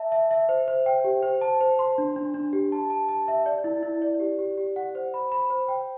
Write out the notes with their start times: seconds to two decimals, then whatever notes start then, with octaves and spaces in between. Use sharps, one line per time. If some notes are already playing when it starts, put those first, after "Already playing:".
Already playing: E5 A5
0.12 E5
0.31 E5
0.49 C5
0.68 C5
0.86 G5
1.04 G4
1.23 C5
1.41 A5
1.61 C5
1.79 C6
1.98 D4
2.16 D4
2.34 D4
2.53 G4
2.72 A5
2.90 A5
3.09 A5
3.28 E5
3.46 D5
3.64 E4
3.83 E4
4.02 D5
4.20 G4
4.39 G4
4.58 G4
4.76 F#5
4.95 C5
5.14 B5
5.32 B5
5.50 C5
5.68 G5